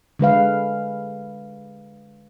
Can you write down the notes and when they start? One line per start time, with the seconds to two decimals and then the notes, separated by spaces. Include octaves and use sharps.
0.19 D3 G#3 B4 F5